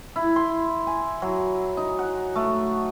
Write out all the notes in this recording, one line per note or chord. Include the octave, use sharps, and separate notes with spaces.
E4
C6
G#5
F#3
D#4
F#5
A3